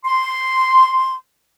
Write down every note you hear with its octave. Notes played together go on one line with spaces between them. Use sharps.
C6